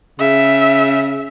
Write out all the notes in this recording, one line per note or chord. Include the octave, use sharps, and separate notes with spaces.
C#3 E5